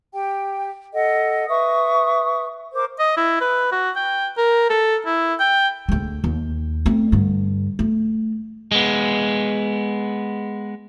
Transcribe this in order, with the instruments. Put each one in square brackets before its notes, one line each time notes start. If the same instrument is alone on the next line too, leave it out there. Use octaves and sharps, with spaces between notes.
[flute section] G4 G5
A4 D#5 F#5
B4 E5 C#6 D#6
A#4 C5 D6
[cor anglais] D#5
E4
B4
F#4
G5
A#4
A4
E4
G5
[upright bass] D2 G#3
D#2
A3 C4
G2 D3
A3
[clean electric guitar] G#3 B3